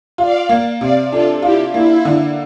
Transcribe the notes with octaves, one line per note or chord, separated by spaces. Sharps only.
F4 D5 F5
A#3
C3 D5 F5
D4 F4 A4
E4 F4 G4
A#3 E4
D3